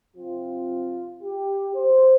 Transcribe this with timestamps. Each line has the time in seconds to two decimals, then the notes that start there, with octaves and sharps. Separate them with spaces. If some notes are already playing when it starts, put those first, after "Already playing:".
0.16 C3 F3 C4 F4
1.22 G4
1.75 C5